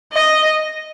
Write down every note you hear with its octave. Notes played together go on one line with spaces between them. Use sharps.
D#5